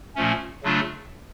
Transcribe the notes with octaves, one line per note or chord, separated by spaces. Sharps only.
A#2 F3 A3 C#4
C#3 F#3 A3 D4 F4